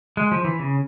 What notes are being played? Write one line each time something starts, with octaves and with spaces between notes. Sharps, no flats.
G#3
F3
E3
C#3